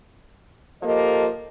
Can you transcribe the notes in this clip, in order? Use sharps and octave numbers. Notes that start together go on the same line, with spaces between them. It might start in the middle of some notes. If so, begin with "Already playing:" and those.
F3 A#3 G4 A4 D#5